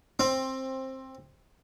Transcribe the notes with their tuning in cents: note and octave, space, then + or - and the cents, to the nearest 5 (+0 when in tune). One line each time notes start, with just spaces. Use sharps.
C4 +15